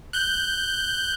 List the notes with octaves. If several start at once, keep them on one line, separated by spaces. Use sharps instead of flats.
F#6 G6